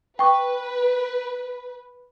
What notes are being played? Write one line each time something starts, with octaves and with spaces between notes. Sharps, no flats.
B4 G5 C#6 D6